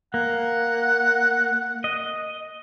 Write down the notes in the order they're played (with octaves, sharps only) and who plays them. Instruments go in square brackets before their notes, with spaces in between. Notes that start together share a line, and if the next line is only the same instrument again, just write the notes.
[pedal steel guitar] A#3 [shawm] F#5
[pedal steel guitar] D#5